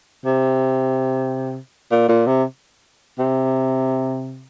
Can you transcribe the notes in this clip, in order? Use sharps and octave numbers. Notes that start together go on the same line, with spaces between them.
C3
A#2
A#2
C3
C3